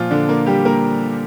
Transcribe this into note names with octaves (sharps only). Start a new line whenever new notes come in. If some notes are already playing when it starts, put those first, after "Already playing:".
Already playing: A#2 F3 F4
D3 D4
A#3
G3 G4
A#3 A#4